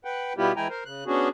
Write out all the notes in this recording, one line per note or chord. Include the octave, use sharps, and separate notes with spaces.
B4 F#5 G5
B2 G3 B3 E4 F4 G4
E3 G#3 E4 G5 G#5 A#5
A#4 C5
C#3 F#6
B3 C#4 D4 F#4 G#4